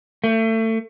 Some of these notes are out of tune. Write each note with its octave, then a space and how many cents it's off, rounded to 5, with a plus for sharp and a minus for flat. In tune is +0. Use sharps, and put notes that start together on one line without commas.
A3 +30